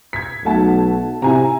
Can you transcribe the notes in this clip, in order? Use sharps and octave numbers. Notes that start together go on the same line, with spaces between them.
G#6 B6
B1 A3 F#5 A5
C3 E4 G#5 A#5